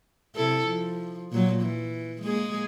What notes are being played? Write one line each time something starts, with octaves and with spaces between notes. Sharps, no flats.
C3 E4 A4
F3
A#2 F#3
E3
G#3 A#3 G#4